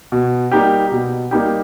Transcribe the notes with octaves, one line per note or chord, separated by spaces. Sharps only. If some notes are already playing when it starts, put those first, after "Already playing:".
B2
G3 A#3 D#4 G4
B2
G3 A#3 D#4 G4